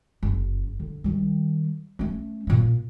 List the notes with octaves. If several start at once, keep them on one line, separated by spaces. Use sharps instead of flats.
F#1
D3
D#3 G3
A3 C#4
A#2 A#3